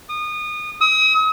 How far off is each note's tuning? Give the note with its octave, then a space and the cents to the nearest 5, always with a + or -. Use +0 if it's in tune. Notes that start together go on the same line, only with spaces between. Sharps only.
D#6 -30
D#6 +40